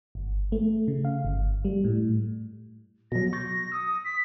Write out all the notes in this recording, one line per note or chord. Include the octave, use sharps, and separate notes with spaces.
G1
A3
C#3
F5
G1
G3
A2
B2 F#3 A#6
C#6 G6 A6
D#6 E6 C#7
B6